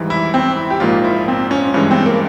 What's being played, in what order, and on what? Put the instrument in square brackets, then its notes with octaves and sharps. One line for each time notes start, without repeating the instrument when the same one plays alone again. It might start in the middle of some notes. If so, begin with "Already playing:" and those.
Already playing: [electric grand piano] G#1 G#2 E3 G3
[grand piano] E4
C4
E4
G4
[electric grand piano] A#1 G#2 F3 A#3 [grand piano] F4
[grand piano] E4
C4
C#4
[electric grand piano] G2 E3 G#3 [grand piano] C#4
[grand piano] C4
A#3